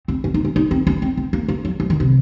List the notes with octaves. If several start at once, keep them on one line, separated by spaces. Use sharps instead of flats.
C4
C#4
D#4
C#4
D#4
C4
C#4
C4
C4
A#3
A#3
F#3
F3
D#3
C3